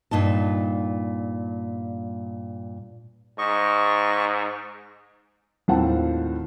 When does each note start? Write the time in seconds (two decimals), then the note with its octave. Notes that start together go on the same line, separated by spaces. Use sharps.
0.11 G2 A#2 D#4 A5
3.38 G#2 D#5 C#6
5.68 D#2 A2 C4 F4 F#5 A5